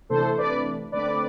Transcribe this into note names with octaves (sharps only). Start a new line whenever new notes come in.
C3 E3 A3 D4 A4 C5
B4 D5
D3 A3 C4 B4 D5